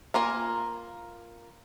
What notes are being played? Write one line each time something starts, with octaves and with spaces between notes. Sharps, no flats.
A#3 F4 A#4 G#5